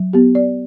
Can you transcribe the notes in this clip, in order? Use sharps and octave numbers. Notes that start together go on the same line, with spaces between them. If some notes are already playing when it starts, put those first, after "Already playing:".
Already playing: F#3
B3 G4
D5